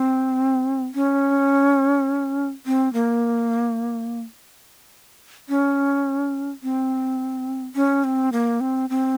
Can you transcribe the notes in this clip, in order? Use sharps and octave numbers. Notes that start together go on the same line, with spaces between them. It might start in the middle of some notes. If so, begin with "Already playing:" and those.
Already playing: C4
C#4
C4
A#3
C#4
C4
C#4
C4
A#3
C4
C4